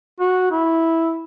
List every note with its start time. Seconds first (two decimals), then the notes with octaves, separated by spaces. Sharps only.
0.20 F#4
0.51 E4